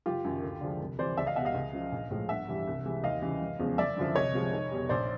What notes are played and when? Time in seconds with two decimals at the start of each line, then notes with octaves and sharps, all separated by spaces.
0.06 F#1 F4 G4
0.24 F#2 D#3
0.43 D2
0.61 D3 F3 G#3
0.80 C2
0.99 C3 E3 C5 D5
1.17 C#2 D5 E5
1.26 D#5 F5
1.36 B2 E5 F#5
1.40 G3
1.45 D#5 F5
1.54 C#2
1.73 C#3 F3
1.92 A#1
2.11 A2 F3 G#3
2.29 G1 E5 F#5
2.48 G2 E3 G3
2.67 C2
2.85 C3 E3 G#3
3.04 D#2 D#5 F5
3.22 C#3 E3 G3
3.41 F#1
3.59 E2 C#3 F3 G#3
3.78 F#1 D5 E5
3.96 F#2 D3 F3
4.15 C2 C#5 D#5
4.34 C3 F3 G#3
4.52 F1
4.72 E2 B2 G3
4.89 A#1 C5 D5